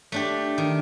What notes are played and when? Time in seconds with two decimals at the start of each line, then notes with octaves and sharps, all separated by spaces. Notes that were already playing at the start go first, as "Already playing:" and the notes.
0.12 A3 D4 G4
0.58 D#3